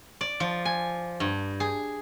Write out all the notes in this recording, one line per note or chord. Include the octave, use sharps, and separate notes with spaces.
D5
F3
G#5
G2
G#4